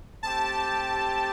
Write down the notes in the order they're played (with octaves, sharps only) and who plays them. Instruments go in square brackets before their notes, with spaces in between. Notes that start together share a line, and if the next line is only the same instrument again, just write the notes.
[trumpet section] A3 C4 G4 [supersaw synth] A5